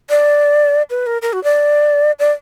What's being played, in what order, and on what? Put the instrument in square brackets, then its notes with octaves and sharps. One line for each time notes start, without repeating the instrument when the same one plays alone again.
[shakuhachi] D5
B4
A#4
A#4
F#4
D5
D5